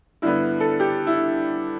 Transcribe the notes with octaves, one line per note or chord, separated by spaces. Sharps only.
G2 D3 B3 E4
A4
G4
E4